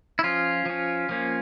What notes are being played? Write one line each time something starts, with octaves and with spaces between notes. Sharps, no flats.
E4
F3 C#4 F4
F3 C#4
F3 A#3 C#4